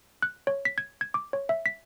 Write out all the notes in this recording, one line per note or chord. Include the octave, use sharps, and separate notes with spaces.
F#6
C#5
B6
G#6
G#6
D6
C#5
E5
B6